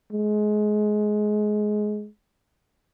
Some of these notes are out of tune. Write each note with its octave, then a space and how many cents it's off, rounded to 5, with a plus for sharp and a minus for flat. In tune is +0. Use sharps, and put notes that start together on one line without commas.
G#3 +20